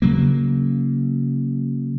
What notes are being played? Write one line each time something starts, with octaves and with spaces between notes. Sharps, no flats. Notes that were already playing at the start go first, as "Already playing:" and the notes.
C#3 F#3 A#3